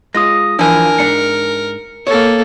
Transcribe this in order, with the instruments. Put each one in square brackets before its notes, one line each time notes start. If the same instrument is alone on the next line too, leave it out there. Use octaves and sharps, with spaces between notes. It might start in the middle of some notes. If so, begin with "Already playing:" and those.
[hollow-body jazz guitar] G#3 F4 [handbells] D#6 A#6
[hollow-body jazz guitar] E3 F3 [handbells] D4 G#5 [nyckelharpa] A#4
[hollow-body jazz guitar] G#2 D4 [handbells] C#7
[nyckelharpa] A#3 A4 [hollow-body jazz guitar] C#5